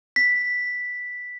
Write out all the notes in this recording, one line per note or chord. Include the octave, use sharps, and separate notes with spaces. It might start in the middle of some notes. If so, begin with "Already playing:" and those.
B6